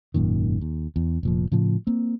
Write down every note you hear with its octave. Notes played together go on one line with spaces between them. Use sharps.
G#1 F#2 A#2 D#3
D#2
E2
F1 A#2 F3
A2 C#3 F3
A#3 C4